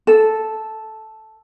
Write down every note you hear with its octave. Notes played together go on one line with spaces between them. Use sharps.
A4